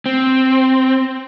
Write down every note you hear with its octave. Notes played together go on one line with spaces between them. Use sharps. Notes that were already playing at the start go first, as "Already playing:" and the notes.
C4